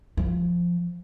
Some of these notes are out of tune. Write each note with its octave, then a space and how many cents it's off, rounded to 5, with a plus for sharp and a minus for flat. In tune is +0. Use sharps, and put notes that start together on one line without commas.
F3 +0